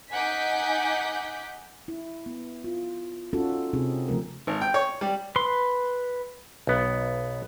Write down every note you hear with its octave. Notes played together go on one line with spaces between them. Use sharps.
D#4 F#5 G#5 D6 G6 B6
E4
B3
F4
C#4 D#4 F4 F#4 A4
C3 C4 D#4 G#4
C#3 F3 A3 A#4
G#1
G5
C#5
G3
B4 C6
B1 B3